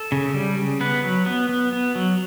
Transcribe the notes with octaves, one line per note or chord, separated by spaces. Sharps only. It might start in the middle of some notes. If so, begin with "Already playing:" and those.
Already playing: A4
C#3
G3
C#3
B3 B4
F#3
B3
B3
B3
F#3